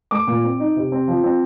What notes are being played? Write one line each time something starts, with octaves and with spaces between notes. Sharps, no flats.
A3 D6
A#2
C4
D#4
C3
C4
F3
C4